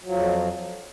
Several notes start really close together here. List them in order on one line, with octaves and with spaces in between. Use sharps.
F#3 F3 F2